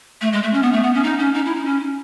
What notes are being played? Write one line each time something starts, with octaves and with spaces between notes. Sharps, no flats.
A3
G#3
A3
C#4
B3
A3
B3
C#4
D#4
C#4
D#4
E4
D#4
C#4